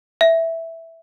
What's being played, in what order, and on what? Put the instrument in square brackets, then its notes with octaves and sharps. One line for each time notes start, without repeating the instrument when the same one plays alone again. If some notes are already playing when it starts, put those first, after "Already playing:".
[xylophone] E5